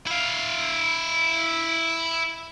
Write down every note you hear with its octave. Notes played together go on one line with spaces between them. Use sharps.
E4 F5